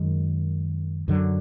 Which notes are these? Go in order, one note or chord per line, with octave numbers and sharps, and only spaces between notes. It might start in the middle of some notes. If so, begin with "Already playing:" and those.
Already playing: F#2 D#3 G#3
F#2 D3 F#3